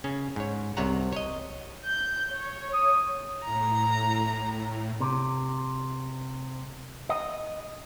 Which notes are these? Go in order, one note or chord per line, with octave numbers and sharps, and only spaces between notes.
C#3 C#4
G#2 C#5
C2 C3 C#5 F#5 A#5
C#5 D#5
G6
C#5
D#6
A2 A#5
C3
D#5